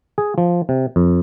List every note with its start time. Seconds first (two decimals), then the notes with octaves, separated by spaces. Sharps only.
0.18 G#4
0.38 F3
0.69 C3
0.96 F2